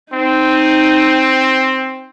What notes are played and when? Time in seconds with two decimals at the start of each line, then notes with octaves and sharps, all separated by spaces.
0.13 C4 D#4